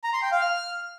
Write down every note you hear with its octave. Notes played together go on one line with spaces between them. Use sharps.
A#5
C6
G5
F5
F6